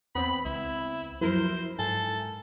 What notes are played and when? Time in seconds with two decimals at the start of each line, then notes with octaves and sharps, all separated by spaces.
0.15 E2 B3 C4 B5
0.45 C#2 E4
1.21 F#2 F3 E4 A#4 C5
1.79 G#2 A4 G#5